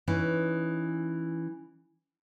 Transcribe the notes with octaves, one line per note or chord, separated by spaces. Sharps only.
E3 C#4 D#4